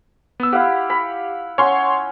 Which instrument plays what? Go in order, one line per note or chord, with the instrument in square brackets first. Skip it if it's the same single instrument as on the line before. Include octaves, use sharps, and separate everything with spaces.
[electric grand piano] B3 E6
[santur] E4 F5 F#5 [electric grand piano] G4
[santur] B5
[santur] C#4 F#5 [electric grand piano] C#5 C6